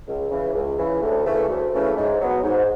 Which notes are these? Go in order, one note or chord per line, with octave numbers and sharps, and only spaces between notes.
C#2
C#3 E3
C#2
C#3 E3
D2
C#3 E3 A3
D2
C#3 E3 A3
G#2
F#3 B3
G#2